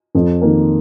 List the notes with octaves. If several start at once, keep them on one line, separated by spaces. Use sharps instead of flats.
F2
D#3 A#3